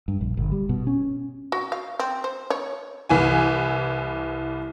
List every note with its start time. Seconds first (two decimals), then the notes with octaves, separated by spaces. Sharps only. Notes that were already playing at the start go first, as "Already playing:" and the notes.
0.08 G2
0.21 A#1
0.37 G1
0.52 G3
0.69 B2
0.87 C#4
1.52 F#4
1.72 F5
1.99 C4
2.24 C5
2.50 C#5
3.09 C2 E3 G#5